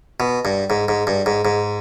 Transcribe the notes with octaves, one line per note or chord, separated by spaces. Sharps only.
B2
G2
G#2
G#2
G2
G#2
G#2